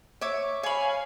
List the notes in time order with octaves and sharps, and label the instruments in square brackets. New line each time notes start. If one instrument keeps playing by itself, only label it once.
[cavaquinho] C#5 E5 D6
[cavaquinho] C#5 B5 [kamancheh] F5 G#5